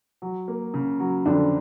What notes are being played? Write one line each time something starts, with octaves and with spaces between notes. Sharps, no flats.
F#3
A#3
C#3
F#3
F2 D3 D4